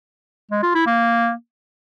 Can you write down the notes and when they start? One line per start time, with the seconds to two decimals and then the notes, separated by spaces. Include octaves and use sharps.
0.51 G#3
0.63 F4
0.75 E4
0.86 A#3